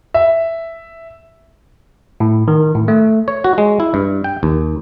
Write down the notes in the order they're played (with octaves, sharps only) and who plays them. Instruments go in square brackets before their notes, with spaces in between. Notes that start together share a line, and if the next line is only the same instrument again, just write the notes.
[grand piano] E5
[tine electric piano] A2
D#3
A2
A3
[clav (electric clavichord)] C#5
F#4
G#3
E4
G2
G5
D#2